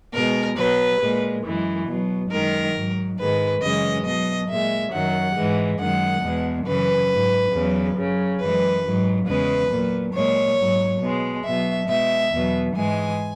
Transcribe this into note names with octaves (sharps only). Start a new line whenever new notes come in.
B2 G#3 A#4
B2 F#3 B4
A#2 G#3
F#2 E3 G#3
B2 F#3
F#2 D#3 G#3 A#4
G#2 F#3
G#2 D#3 G#3 B4
F#2 C#3 E3 G#3 D#5
B2 F#3 D#5
A#2 G#3 E5
F#2 D#3 F#3 F#5
G#2 E3 G#3
F#2 D#3 G#3 F#5
E2 B2 G#3
F#2 C#3 E3 B4
G#2 F#3
E2 C#3 F#3
F#2 C#3 F#3
F#2 E3 G#3 B4
G#2 F#3
E2 C#3 G#3 B4
A#2 F#3
A#2 G#3 C#5
G#2 F#3
B2 G#3
B2 F#3 E5
B2 G#3 E5
E2 B2 F#3
G#2 E3 G#3 G#5